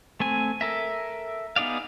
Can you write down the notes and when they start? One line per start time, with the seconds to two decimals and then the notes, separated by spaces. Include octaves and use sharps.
0.20 A3 C4 G#5
0.61 A4 A#4 E5
1.56 B3 D#4 G#4 D5 F5